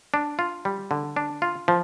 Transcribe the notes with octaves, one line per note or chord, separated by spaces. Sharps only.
D4
F4
G3
D3
D4
F4
F3